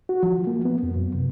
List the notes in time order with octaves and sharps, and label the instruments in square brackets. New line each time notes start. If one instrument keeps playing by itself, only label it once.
[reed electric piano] F#4
F3
A#3
B3
F2
F#2
C3